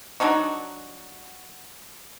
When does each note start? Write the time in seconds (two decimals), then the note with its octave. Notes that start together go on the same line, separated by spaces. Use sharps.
0.20 F#3 D4 D#4 F#4